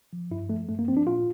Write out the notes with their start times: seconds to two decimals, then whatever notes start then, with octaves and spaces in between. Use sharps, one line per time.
0.13 F3
0.30 G2 E4
0.49 F3 A3
0.69 G2 A3
0.79 A#3
0.88 F3 C4
0.97 D4
1.06 A#2 F4